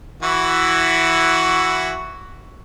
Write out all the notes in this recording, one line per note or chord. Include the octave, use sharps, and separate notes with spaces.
E3 E4 F#4